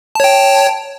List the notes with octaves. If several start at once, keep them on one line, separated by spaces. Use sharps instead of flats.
C#5 G5 A5